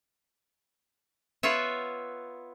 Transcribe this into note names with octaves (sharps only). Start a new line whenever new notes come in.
B3 F4 B4 C#5 E5